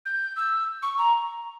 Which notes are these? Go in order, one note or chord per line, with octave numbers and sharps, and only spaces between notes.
G6
E6
C#6
A#5